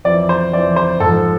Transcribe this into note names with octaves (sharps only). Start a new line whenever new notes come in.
F2 E3 D5
C5
F2 E3 D5
C5
G#2 F3 A4